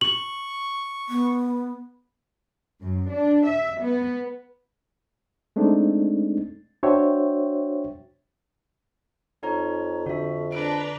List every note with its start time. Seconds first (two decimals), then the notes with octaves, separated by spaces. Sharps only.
0.01 C#6 F#7
1.09 B3
2.81 F#2
3.10 D4
3.48 E5
3.82 B3
5.56 G#3 A3 C4 D4 D#4
6.83 D4 F#4 C5 C#5 E5 G5
9.43 F2 D#4 C#5 A#5
10.06 D3 F#4 E5
10.52 D4 B4 A#5 D7